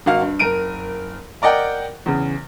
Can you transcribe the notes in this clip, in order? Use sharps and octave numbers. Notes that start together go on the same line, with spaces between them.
G#1 F#4 F5 F6
G2
F#1 A#4 D7 D#7
A#4 D5 D#5 F#5 G5
E2 C#3